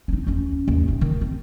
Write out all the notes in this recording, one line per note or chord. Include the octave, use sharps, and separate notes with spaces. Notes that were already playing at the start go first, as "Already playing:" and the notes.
C4 D#4
D#2 C#4
D#2 G#2
D1 D#4
D#3
C4